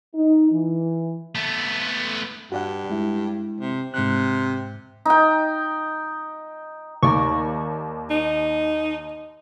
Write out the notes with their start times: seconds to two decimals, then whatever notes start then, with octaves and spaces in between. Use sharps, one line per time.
0.14 D#4
0.51 E3
1.35 A3 B3
2.52 G2 F#4 D5 F#5
2.90 G#3 E4
3.61 C3
3.94 G#2 C3 F#6
5.05 D#4 G5
7.03 D#2 A#4 D5 C#6
8.10 D#4